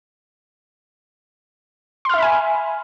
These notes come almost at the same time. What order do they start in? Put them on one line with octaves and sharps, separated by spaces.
C6 F6 E5 B5 G#5